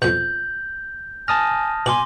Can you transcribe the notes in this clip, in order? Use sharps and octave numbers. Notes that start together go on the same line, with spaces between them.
F2 B2 G6 F#7
G#5 A5 D#6 F6 A#6
B2 G#5 C6 D6 F#7